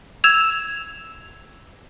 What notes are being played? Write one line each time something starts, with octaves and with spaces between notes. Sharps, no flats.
E6 G#6 E7 F7